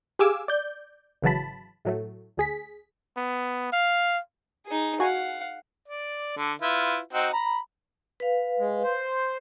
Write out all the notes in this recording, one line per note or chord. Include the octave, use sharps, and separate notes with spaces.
G4 G#4 F5 G#5 D6 E6
D5 G6
G#1 C#3 E3 F#3 A5 B5
A2 F#3 A3
D2 G#4 B6
B3
F5
D#4 G#4
F#4 F5 F#5 G#5
D5
D3
E4 F4 B4
C4 D#4 F#4
A#5 B5
B4 F5
G#3
C5